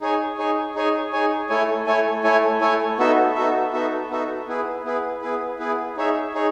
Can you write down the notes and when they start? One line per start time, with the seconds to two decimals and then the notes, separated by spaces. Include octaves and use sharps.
0.01 D#4 G#4 C#5 G#5
0.38 D#4 G#4 C#5 G#5
0.75 D#4 G#4 C#5 G#5
1.13 D#4 G#4 C#5 G#5
1.49 A3 E4 A4 C#5 G#5
1.86 A3 E4 A4 C#5 G#5
2.24 A3 E4 A4 C#5 G#5
2.61 A3 E4 A4 C#5 G#5
2.98 B3 D#4 F#4 A4 E5
3.35 B3 D#4 F#4 A4 E5
3.73 B3 D#4 F#4 A4 E5
4.10 B3 D#4 F#4 A4 E5
4.48 B3 E4 G#4 B4
4.84 B3 E4 G#4 B4
5.22 B3 E4 G#4 B4
5.59 B3 E4 G#4 B4
5.97 D#4 G#4 C#5 E5
6.34 D#4 G#4 C#5